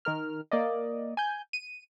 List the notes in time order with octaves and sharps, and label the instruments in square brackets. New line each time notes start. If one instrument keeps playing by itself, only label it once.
[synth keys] D#3 A#4 F6
A#3 D5 D#5
G#5 G6
D#7